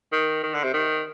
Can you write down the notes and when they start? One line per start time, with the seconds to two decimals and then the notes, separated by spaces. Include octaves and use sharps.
0.12 D#3
0.43 D#3
0.54 D3
0.64 C3
0.74 D#3